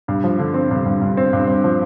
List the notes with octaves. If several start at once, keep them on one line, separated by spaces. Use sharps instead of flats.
G2
F3
D3
C4
G2
G2
G2
C4
G2
C4
F3